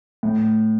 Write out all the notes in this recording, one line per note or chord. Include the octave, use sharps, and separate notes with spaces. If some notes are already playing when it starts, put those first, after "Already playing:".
A2